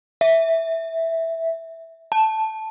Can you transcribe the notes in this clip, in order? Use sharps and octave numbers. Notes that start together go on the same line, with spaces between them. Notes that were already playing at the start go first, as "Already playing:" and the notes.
E5
A5